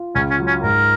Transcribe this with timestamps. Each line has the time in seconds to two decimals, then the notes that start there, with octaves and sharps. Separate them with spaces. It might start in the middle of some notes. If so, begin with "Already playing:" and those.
Already playing: F4
0.15 C#2 C#4
0.31 C#4
0.40 F#3
0.47 C#4
0.63 G#2 A#4